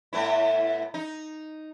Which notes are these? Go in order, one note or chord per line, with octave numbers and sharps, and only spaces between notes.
A2 B3 E4
D#4